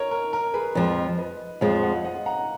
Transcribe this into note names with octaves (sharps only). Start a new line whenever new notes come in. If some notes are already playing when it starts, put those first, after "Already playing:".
Already playing: A#4 C#5 D#5
A#4
A#4
G#4 B4
F2 F3 G#3
B4 D#5
F2 F3 G#3 C#5 F5
D#5 F#5
D#5 F#5
F#5 A#5